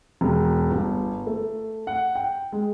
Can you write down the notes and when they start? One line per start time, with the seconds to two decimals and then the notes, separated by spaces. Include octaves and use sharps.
0.21 E1
0.71 G1
1.27 A3
1.87 F#5
2.15 G5
2.52 G#3